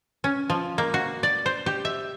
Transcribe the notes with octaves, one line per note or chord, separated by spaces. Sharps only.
C#4
F3
A#3
F#4
D5
C5
G4
E5